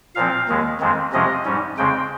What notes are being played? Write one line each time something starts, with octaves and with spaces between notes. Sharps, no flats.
A#2 F3 C4 F5
D#2 D#3 G#3
F2 D#3 G#3 C4
F2 C3 F3 G#3 C#4 D#5
G#2 G3 C#4
F2 C#3 G#3 C4 G5